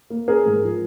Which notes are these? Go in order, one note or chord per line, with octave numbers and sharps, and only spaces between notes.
A#3
C#4 G#4 A#4
G#2
F3